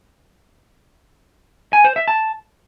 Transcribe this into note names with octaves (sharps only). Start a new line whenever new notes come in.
G#5
C5
E5
A5